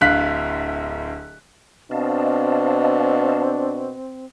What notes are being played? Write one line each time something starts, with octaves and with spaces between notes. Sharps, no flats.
D1 D2 F5 F#6 B6
B2 C4 D4 D#5 F5 A5